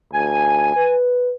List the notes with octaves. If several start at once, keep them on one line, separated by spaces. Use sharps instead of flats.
D2 G#5
B4